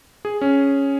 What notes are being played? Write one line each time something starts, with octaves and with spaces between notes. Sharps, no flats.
G#4
C#4